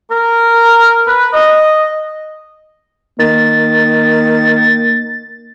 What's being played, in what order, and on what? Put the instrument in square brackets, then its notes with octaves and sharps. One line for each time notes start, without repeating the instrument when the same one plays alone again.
[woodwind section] A#4
B4
D#5
[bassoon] D#3 [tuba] A#3 [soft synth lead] A6